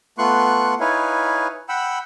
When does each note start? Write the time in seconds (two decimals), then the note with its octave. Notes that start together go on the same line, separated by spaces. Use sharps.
0.18 A3 B3 F4 C6 C#6 F#6
0.80 D#4 E4 B4 C#5 F5 G#5
1.69 F#5 G5 B5 E6